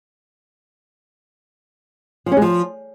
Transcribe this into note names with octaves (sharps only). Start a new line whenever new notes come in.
F3
C#4
G#3
F3